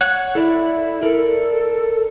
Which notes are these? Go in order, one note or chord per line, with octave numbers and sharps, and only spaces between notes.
C#5 F#5 F#6
E4 A4 D5 E5
A4 A#4 D5